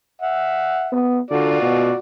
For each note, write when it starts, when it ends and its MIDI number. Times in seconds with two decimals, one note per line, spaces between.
0.22 0.95 76
0.22 0.95 78
0.92 1.19 59
1.31 1.61 50
1.31 1.96 65
1.31 1.96 66
1.31 1.96 74
1.62 1.90 47